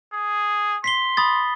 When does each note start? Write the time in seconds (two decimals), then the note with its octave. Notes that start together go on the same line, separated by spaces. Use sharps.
0.13 G#4
0.84 C6 B6 C7 G7
1.17 B5 D#6 A6